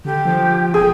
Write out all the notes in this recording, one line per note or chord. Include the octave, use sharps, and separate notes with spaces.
D3 G4
F3
E1 G#4 G5